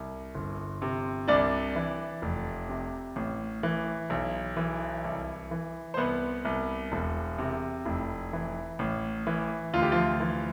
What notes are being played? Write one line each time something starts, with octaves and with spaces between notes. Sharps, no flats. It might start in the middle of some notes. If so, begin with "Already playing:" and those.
Already playing: C2
G1
C3
C2 D4 D5
E3
F1
C3
A1
E3
B1
E3
C2
E3
C5
C2 B3 B4
C2
E1
C3
F1 E4
E3
A1
E3
D2 F4
G4
F3 F4
E3